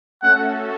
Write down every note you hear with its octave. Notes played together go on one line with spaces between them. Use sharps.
A3 C#4 F#4 A4 F#5